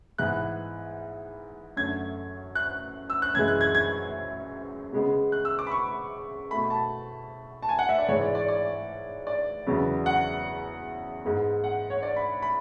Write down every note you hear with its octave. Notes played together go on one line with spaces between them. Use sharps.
G#2 E3 B3 F#6
F#2 D3 A3 G#6
F#6
E6
F#6
F#2 E3 G#3 G#6
F#6
G#6
G#6
C#3 G#3 B3
F#6
E6
D6
B5
C#6
B2 A3 B5
A5
A5
G#5
F#5
E5
D5
G#2 E3 G#3 C#5
D5
D5
D5
D5
E2 C#3 F#3 B3
F#5
G#2 G#3 B3
F#5
C#5
D5
B5
B5